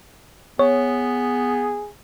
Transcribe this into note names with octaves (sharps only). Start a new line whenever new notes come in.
B3 G#4 C#5